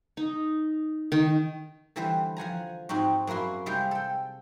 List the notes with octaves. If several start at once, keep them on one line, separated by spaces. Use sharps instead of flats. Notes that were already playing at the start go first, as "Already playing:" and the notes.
D#4
D#3
D3 E3 G3 E4 B4 C5
F3 F#5 G#5 A#5
G#2 C4 D#4 F#4
F#2 A#3 E4 F#4 C6
C3 G3 G#3 F5 G5
A4 G5